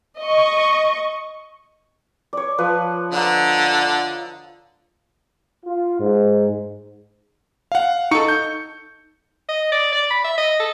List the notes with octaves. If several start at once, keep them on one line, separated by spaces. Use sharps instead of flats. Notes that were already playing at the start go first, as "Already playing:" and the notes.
D#5 C#6
C#5 D5
F3 B4 A5
D3 D#5 A#5
F4
G#2
F5 F#5
D#4 A4 C#6 C#7
G6
D#5
D5
D5
B5
E5
D#5
A4